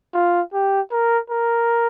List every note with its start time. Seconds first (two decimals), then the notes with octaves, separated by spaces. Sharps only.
0.14 F4
0.53 G4
0.91 A#4
1.30 A#4